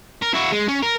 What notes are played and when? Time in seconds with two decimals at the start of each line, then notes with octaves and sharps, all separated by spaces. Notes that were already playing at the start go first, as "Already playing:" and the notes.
0.22 A#4
0.34 E4 F#4
0.52 G#3
0.69 C#4
0.83 A#4